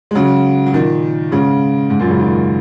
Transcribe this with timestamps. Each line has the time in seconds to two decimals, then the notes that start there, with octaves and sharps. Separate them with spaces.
0.11 G#3
0.15 C#3 F#3
0.66 F#3
0.73 A#2 D#3
1.31 G#2 C#3
1.90 G#2
1.99 F#2 A#2
2.09 G#2 C#3
2.20 A#2 D#3